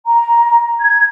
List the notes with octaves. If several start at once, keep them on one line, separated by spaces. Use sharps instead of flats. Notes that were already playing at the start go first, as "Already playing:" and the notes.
A#5
G#6